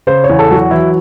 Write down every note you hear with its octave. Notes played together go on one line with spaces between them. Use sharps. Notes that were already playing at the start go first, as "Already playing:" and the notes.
C#3 C5
C#5
E2
A4
F#3 F#4
E3 E4